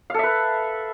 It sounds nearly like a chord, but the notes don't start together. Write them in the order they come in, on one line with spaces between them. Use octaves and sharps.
F5 A4 E5 B4